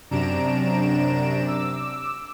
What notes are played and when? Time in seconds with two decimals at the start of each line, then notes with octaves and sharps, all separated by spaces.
0.11 F#2 C3 D4 A#5 D7 E7
1.47 D6 E6